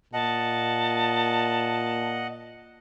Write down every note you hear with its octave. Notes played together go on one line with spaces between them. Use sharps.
A#2 D#5 F#5 A5